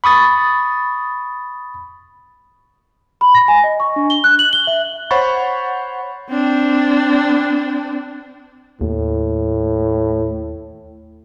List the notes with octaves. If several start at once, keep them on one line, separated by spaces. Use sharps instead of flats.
B5 C#6 D#6 A6
B5
A#6
G#5
D#5
C#6
D4
G7
F#6
F#7
G7
E5
C5 C#5 F#5 B5 C#6 A6
C4 D4
D#2 A2